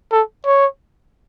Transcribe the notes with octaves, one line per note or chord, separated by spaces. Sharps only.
A4
C#5